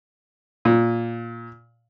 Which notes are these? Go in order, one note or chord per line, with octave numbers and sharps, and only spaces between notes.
A#2